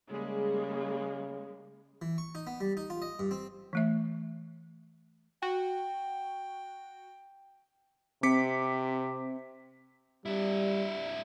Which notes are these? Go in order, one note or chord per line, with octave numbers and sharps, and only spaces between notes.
C#3 G3 G#3 A#3
E3
C#6
D#4
B3
G3
D#4
F4
D#5
G2
C4
E3 A3 E5
F#4 G5
C3 C4 D6 B6 C#7
G3 D4 E4